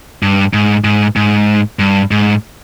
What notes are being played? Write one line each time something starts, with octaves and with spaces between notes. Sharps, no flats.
G2
G#2
G#2
G#2
G2
G#2